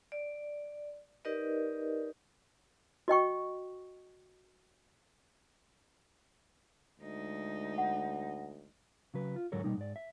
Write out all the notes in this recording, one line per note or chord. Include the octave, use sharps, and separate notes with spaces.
D5
D#4 G4 A#4 B4 D5 D#5
F#4 D#5 G5 C#6
D2 G#3 D#4
F#5
C#3 F#3 B4
F4
D2 G#2 F#3 A4 A#4 C#5
B2 G3 A#3 D#4
G#2 D5
E5